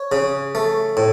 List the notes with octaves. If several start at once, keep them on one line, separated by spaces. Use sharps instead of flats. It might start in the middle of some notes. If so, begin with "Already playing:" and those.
Already playing: C#5
C#3
A3
A2